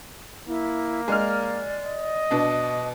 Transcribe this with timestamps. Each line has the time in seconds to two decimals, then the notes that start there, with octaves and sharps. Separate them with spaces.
0.47 A#3 E4
1.08 G#3 D5 F6
1.86 D#5
2.31 B2 D4